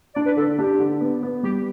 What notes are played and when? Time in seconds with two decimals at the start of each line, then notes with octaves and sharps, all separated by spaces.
0.15 D4 D5
0.26 B4
0.36 D3 A4
0.58 D4 G4
0.79 D3
1.01 B3
1.23 B3
1.43 G3 G4